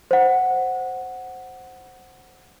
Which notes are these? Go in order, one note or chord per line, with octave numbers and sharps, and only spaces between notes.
C5 F#5